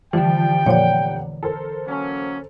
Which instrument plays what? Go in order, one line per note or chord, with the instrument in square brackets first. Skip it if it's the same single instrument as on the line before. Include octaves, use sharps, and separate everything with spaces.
[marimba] D3 E3 [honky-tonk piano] F3 G3 [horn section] G5
[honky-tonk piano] F1 G3 F#5 [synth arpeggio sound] A#2 F3 [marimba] C#5 D5
[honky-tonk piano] A4 A#4 C5
[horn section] F#3 A#3 C#4